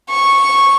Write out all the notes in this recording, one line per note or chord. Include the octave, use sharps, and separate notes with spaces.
C#6